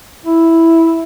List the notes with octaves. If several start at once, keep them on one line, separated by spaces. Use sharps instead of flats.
E4